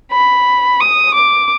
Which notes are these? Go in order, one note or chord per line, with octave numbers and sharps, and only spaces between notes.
B5
D#6
D6